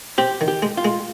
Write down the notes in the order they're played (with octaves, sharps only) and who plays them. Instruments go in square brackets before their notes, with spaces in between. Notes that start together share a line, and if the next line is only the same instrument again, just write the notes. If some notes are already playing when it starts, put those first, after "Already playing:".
[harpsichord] C4 [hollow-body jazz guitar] G4
[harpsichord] D#3
[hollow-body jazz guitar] G4
[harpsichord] G#3
[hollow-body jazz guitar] F4
[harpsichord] G#3